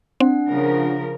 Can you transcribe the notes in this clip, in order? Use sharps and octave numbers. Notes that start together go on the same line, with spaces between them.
C4 D4 F#5
C#3 F3 A#4